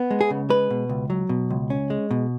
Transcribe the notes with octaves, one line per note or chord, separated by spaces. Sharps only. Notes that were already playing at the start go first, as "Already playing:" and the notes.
Already playing: B3
G#3
G#4
C#3
G#3 B4
B2
C#2
F#3
B2
C#2
C#4
G#3
B2